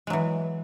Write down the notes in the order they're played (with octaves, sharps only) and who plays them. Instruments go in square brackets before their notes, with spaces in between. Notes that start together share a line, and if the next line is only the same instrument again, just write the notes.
[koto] G#3
F#3
E3